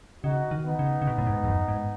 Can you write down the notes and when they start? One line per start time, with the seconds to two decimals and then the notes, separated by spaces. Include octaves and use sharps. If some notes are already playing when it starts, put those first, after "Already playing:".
0.24 C#3 D#4 F#4
0.51 D#3
0.65 B3 D#4
0.79 C#3
1.02 C#3
1.07 B2
1.18 A2
1.27 G#2
1.44 E2
1.48 F#2
1.68 G#2